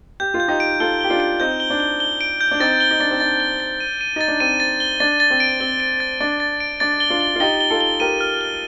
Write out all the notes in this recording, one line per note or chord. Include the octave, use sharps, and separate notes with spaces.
G4 G6
F4
G6
D#4 G4
D7
F4 A4 G7
G4 G7
D4 F4
D7
C4 D#4 G6
G7
D4
G7
G7
D7
G6
D4
C4 D#4 A6
G7
D#4
D4 A6
C4
D4 A6
G7
A6
D#7
D#7
D#4 A6
D4
C4 D#7
A6
G7
D4 A6
A6
C4
D7
C4 G7
D7
A6
D4 A6
A6
D7
D4 A6
G7
D4 F4
G7
F4
D#4 G4 G7
G7
F4 A4
G7
G4 A#4 D#7
F6
G7